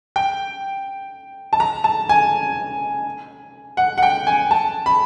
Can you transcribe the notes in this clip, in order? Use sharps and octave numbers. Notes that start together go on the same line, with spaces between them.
G5
A5
A#5
A5
G#5
F#5
F#5
G5
G#5
A5
B5